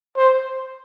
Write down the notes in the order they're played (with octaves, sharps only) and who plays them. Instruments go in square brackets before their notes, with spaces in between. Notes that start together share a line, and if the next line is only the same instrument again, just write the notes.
[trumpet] C5